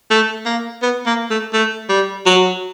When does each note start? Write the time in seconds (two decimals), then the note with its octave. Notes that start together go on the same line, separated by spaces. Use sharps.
0.10 A3
0.45 A#3
0.82 B3
1.06 A#3
1.30 A3
1.53 A3
1.89 G3
2.26 F#3